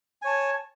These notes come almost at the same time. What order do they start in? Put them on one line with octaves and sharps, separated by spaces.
G#5 C#5 A5